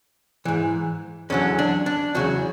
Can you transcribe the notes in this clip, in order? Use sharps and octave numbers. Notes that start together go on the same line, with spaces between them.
G#2 E3
E2 D3 F#3 C#4
D4
D4
E2 C#3 F#3 F#4